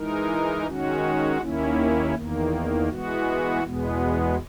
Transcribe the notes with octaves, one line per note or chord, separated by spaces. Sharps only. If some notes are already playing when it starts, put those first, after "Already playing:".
Already playing: E3 G#3 D#4 A#4
D#3 G#3 C#4 F#4
D#2 D#3 A#3 C#4 E4
E2 D#3 A#3
E3 G#3 B3 F#4
E2 B2 G#3 B3